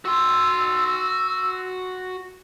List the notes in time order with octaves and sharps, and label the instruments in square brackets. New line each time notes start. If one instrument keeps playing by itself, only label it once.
[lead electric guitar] F#4 C6 [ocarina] E6